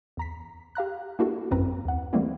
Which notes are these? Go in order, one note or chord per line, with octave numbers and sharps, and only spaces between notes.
E2 A#5 B6
G4 F5 A#5 F#6
A#3 D4 E4 F#4 G4 A4
G#1 F#2 C4 B4 A#5
D#2 F#5
E3 G3 A3 A#3 C4 E4